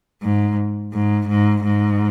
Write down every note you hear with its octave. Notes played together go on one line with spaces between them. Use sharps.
G#2
G#2
G#2
G#2